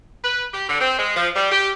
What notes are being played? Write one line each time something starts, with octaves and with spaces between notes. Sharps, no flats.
B4
G4
D3
C4
G#3
F3
G3
G4